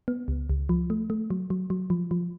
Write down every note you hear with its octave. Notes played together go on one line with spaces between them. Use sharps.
B3
C#2
C#2
F3
A3
A3
F#3
F#3
F#3
F3
F3